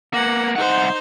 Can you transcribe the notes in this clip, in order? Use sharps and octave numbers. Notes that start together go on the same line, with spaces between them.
A#3 B3 F#5
C2 D#4 C5 F#5